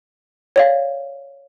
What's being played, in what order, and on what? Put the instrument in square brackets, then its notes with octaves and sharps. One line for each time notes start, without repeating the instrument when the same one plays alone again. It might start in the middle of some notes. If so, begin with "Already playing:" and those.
[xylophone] C#5 D5 F5